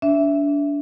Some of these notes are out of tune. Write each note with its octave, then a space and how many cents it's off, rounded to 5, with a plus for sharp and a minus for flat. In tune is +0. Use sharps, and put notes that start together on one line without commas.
D4 -30 E5 +0